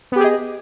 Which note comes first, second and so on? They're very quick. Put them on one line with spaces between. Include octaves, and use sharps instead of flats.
B3 G4 G#4 D#5